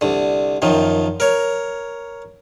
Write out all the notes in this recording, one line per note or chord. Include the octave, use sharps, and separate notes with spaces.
C2 D3
F#2 D#3 F3
A#4 C#5